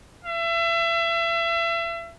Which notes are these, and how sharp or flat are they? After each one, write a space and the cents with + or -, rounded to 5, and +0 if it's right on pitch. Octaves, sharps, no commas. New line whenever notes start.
E5 +35